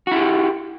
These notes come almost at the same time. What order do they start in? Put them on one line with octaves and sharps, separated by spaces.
F#4 E4 G4